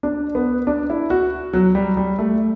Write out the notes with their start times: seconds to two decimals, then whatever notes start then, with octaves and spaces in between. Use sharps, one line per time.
0.03 D4
0.35 B3
0.67 D4
0.90 E4
1.10 F#4
1.53 F#3
1.75 G3
1.97 G3
2.19 A3